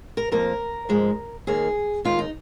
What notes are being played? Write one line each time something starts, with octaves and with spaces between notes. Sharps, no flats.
A#4
F2 F3 A#3 A#4
G#2 F3 G#3
D#2 D#3 A#3 G#4
D#2 D#3 G#3 F4
D#4